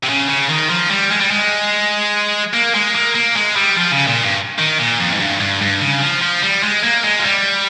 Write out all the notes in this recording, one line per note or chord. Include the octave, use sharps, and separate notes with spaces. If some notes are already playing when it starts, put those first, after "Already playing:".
C3
C#3
C#3
D#3
F3
G3
G#3
G3
G#3
A#3
G#3
A#3
A#3
G#3
G3
F3
C#3
A#2
G2
D#3
A#2
F2
G#2
G2
G2
G2
C#3
F3
F3
G3
G#3
A#3
G#3
F3
G3